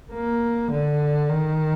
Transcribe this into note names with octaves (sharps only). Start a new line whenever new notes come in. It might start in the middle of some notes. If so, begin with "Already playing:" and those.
A#3
D3
D#3